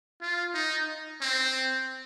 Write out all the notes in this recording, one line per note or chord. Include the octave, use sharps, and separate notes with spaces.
F4
D#4
C4